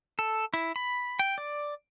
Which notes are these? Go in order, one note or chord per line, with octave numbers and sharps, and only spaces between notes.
A4
E4
B5
G5
D5